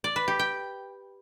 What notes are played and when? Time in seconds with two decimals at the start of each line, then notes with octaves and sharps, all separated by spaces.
0.04 D5
0.16 B4
0.28 G4
0.39 G5